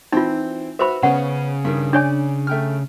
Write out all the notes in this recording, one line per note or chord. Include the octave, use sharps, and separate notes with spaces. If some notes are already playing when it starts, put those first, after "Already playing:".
E3 C4 D#4 F4
F#4 B4 C5 E5 B5
C#3 B3 C#4 F#5
G2 D#3
D4 C#5 D5 G#5
A3 G5 F6